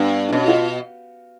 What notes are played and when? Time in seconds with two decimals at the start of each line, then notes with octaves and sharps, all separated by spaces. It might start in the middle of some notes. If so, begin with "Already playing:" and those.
Already playing: G2 B3
0.29 D4
0.32 B2 C#4
0.44 F#4
0.48 F4